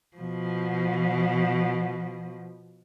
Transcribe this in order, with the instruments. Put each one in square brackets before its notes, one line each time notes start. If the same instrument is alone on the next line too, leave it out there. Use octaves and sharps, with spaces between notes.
[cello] B2 F3